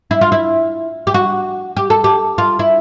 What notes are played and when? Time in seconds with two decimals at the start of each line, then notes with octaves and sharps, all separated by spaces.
0.11 E4
0.21 F4
0.32 E4
1.07 G4
1.14 F#4
1.77 G4
1.90 A4
2.04 G4
2.38 F4
2.59 E4